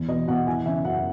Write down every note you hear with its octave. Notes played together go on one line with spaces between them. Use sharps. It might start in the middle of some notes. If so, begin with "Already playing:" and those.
Already playing: E2
B2 D#5
B2 F#5
E3 G#5
C#3 E5
F#2 F#5